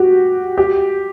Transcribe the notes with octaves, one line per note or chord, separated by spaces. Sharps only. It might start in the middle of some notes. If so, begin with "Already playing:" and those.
Already playing: F#4 G4
G4